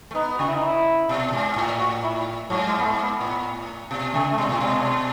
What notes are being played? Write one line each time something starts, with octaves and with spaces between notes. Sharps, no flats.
A3
B3 D#4
C#3 F#4
E4
D#4
E4
B2
G#2
A2
F#4
E4
G#2 F#3
G#3
B3
A3
B3
A2 B3
B2
C#3 A3
A3
B2 G#3
A2
B2 G#3